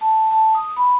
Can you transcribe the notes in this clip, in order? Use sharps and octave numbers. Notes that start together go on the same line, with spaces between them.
A5
A5
D#6
B5